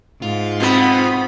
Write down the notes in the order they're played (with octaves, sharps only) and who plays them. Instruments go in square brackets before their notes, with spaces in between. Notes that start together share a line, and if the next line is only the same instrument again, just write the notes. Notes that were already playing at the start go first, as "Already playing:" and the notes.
[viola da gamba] G#2 [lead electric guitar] F4
[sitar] B2 B3 [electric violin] C4 B5